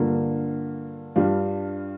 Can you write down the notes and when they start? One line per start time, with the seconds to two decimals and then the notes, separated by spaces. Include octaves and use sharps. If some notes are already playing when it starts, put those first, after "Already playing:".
Already playing: G2 D3 A#3 F4
1.16 G2 G3 D4 F4